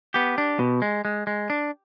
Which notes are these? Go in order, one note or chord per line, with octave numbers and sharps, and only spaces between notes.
B3 G4
D4
B2
G#3
G#3
G#3
D4